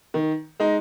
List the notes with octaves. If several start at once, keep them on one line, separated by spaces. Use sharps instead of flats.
D#3
G#3 D#4